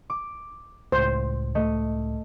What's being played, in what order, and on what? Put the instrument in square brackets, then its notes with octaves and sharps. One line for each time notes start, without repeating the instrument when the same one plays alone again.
[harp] D6
[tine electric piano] C#2 A2 [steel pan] C5
[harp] A3 D#5